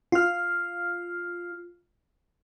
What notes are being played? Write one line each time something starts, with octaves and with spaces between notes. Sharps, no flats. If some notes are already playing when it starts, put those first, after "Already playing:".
F4 F6